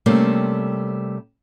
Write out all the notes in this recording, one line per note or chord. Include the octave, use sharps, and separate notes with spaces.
C3 G3 A3 A#3 C4 C#4